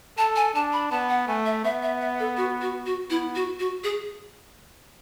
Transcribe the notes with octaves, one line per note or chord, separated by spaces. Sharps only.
A4 A5
G#5
D4 A5
B5
B3 A5
F#5
A3 G#5
E5
B3 E5
E5
E5
A4
F#4
F#4
F#4
B3 E4
F#4
F#4
G#4